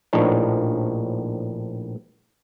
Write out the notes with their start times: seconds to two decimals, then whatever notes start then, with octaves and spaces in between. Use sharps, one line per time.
0.13 A#1 A2 F3 D4 D#4 C#5